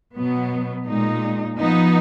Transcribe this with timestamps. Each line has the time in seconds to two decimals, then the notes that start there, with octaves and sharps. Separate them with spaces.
0.16 B2 F#3 B3
0.86 A#2 G#3 D#4
1.57 F3 B3 D#4